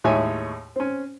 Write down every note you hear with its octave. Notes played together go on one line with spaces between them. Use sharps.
D#2 A2 G#3 C#5 E5 G#5
C4 C#4